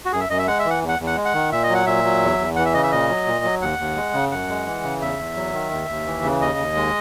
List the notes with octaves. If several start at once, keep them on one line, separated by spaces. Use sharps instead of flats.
F#4
F#2 G#4
E5
F#2 D#5
E5
G#3 F#5
E5
E3
F#5
E2
F#5
E2
F#5
G#3
F#5
D#3
A#2 E5
D#5
F#3 F#5
A#2 E5
F#3
E2
E2
E3 F#5
E5
C#3 D#5
E5
A#2 D#5
F#3
A#2
F#3
D#2 F#5
D#2
G#3
C#3
F#2 F#5
G#3
E3
C#3
E2 E5
E2
F#3
D#3
D#2
D#2
E3
C#3
D#2 D#5
D#2
G#3